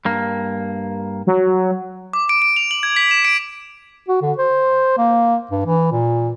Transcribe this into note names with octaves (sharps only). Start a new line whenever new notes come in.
G2 A#3
F#3
D6
D7
D7
F7
F#7
G#6
B6
E7
D7
F#4
D3
C5
A#3
G2
E3
A#2